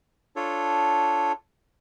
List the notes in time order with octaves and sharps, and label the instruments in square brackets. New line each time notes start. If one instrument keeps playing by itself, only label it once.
[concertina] D4 F4 A4 C#5